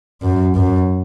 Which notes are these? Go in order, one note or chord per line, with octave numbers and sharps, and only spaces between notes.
F#2
F#2